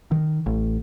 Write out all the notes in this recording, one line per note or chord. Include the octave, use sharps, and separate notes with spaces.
D#3
A1